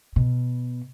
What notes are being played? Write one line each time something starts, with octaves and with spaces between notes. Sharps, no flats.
B2